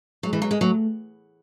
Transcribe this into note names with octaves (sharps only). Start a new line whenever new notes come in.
F#3 G#3
E3
F#3
G#3
F#3 A3